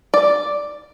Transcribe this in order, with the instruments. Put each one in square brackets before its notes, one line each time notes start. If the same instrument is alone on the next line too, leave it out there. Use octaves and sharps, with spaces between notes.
[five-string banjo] D5